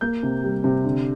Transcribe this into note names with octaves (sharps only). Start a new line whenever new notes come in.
A#3 G6
C3
G3
C3
D3